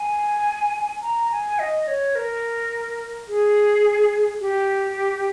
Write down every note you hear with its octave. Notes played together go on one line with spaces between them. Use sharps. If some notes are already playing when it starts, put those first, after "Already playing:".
Already playing: G#5
A#5
G#5
D#5
C#5
A#4
G#4
G4